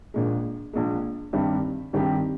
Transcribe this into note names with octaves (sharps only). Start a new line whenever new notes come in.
A#1 A#2 G#3
A#1 A#2 G#3
G2 D#3 G3 C4 G4
G2 D#3 G3 C4 G4